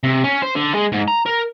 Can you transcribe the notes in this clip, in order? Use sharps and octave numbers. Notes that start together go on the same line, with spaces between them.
C3
C#4
C5
D3
G#3
G#2
A#5
A#4